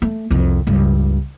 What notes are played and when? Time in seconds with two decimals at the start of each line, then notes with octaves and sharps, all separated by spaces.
0.02 A3
0.31 C2 F2
0.67 C#2 G2